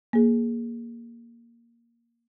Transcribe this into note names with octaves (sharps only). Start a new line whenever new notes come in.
A#3 G#4